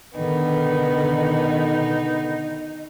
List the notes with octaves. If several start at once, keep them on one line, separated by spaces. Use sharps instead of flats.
B2 D3 D#3 B3 D#4